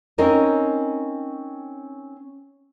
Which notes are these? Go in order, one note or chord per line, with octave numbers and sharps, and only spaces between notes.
C4 C#4 D#4 A#4 C#5 D#5